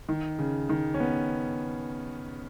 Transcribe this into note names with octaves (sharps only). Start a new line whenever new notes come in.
D#3
C#3
D#3
C#4
B3